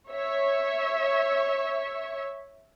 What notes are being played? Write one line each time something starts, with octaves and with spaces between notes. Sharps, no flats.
C#5 E5 C#6